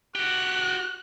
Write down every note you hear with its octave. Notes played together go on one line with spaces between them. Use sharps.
F#4 G4 F#6